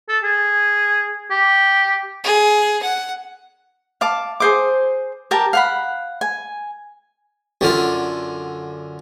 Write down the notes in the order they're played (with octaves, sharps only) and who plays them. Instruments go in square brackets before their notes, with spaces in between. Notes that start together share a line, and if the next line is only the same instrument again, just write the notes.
[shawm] A4
G#4
G4
[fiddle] G#4
F#5
[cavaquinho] F5 A5 D6
G#4 C5 D6
G4 A#4 A5
F5 F#5 B5
G#5
[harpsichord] F#2 D3 F4